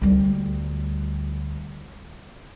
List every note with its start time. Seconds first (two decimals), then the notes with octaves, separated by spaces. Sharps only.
0.02 D2 G3